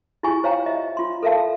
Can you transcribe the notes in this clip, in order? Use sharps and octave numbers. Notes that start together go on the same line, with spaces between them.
E4 F4 G4 G#4 G#5 C#6
C5 C#5 F5 G5 A#5
D#5 E5
F4 C6
A4 A#4 E5 F5 A5